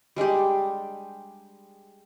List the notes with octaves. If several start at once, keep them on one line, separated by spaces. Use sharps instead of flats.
G3 G#3 D4 G4